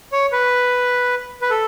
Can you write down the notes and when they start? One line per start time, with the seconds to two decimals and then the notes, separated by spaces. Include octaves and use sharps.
0.12 C#5
0.32 B4
1.42 B4
1.50 A4